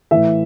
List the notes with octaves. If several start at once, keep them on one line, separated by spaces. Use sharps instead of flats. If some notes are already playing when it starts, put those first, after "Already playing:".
A2 E3 E5